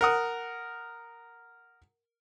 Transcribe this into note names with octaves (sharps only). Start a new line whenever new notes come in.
A#4 F#5 D#6